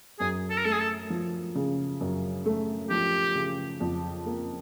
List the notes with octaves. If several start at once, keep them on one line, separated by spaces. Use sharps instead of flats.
F#2 G#4
A4
A#4
A3 A4
G#4
A4
F3
C#3
F#2
A3
F3 G4
C#3
F2
A#3